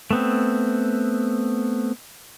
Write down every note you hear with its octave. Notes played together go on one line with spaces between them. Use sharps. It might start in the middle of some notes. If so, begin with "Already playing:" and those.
A3 B3 C4